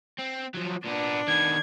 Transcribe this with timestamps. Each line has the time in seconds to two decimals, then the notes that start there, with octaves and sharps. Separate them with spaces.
0.19 C4
0.55 F3 F#3
0.85 A#2 B3 D4
1.28 D#3 B3 G#6